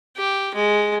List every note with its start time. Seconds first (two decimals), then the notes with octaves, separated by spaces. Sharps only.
0.17 G4
0.55 G#3